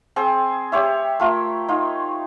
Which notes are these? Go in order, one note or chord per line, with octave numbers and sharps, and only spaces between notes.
C4 G#4 C5
G4 C5 C#5 E5
A3 F4 A#4
D#4 F4